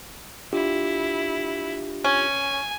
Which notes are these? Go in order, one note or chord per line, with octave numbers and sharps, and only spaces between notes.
D4 E4 F4 G4
C#4 G#5